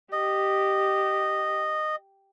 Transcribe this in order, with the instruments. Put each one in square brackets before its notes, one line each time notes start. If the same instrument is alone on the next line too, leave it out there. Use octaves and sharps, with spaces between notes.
[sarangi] G4 [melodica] D#5